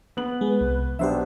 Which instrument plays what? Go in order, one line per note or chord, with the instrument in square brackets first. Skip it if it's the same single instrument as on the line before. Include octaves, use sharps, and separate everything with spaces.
[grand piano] B3 F#7
[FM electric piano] G#3 [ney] B4
[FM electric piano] C2
[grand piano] B1 F#3 B3 [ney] D4 [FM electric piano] G4 C5 E5